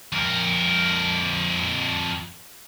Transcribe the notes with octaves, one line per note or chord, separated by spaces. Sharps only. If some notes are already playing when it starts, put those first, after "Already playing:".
F2 A#4